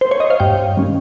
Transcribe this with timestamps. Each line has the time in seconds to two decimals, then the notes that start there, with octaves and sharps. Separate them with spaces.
0.01 C5
0.11 C#5
0.20 D#5
0.30 F5
0.40 G2 G5
0.77 D#3 G3 C#4